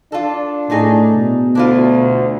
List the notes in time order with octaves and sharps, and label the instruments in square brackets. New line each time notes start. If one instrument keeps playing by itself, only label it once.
[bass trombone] D4 [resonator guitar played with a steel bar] F4 A4
[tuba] A2 [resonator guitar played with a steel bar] A3 D#4 G#4
[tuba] B2
[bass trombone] D2 [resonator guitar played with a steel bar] D4 E4 F4